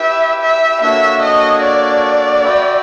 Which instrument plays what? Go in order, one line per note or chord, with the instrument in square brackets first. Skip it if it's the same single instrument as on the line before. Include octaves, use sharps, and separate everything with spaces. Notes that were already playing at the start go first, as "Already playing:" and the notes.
Already playing: [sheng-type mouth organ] E4 G4 B4 [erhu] E5
[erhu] E5
[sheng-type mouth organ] A#3 D4 F#4 A4 C#5 [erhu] E5
[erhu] D#5
D5
[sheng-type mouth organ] F#4 B4 E5 G5